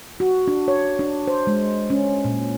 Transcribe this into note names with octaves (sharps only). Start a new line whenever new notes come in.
F#4
D4
C#5
D4
C5
G#3
C#4
A#2